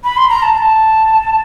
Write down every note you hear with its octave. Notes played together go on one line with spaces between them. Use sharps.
B5
C6
A#5
A5
A#5
A5